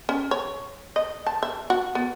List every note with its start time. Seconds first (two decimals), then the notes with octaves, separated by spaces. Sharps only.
0.09 C#4
0.31 C#5
0.96 D#5
1.26 A5
1.43 E5
1.70 F#4
1.95 B3